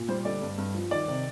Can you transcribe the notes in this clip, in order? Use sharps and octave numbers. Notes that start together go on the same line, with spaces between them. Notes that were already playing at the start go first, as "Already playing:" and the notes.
Already playing: A#2
G3 C5
D3 D5
G2
G2
F3
D#3 D5
C3